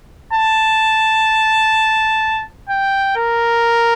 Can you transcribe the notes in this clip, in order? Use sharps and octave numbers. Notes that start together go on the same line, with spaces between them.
A5
G5
A#4